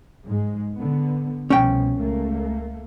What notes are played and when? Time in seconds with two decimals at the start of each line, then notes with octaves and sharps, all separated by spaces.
0.25 G#2 G#3
0.74 D3 B3
1.50 C2 B2 F3 C#4 G5
1.99 C#2 A3 A#3